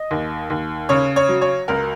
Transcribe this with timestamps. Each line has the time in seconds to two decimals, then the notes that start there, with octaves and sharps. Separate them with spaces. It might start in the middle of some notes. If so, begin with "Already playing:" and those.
Already playing: D#5
0.11 D#2
0.50 D#2
0.89 C#3 C#5
1.16 C#5
1.28 F#3
1.41 C#5
1.68 C#2 A#4